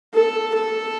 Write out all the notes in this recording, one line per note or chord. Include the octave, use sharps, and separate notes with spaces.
A4
A4